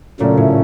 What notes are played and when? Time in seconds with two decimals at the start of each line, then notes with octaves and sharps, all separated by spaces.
0.20 A#2 C#3 F#3 A3 C#4
0.37 A2